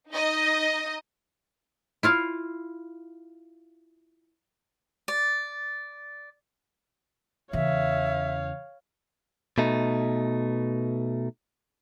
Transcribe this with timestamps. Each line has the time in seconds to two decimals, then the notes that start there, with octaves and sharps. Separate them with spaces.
0.11 D#4 D#5
2.03 E4 F4 F5
5.08 D5
7.53 E2 C#3 C#5 E5 F5
9.58 B2 A3 D#4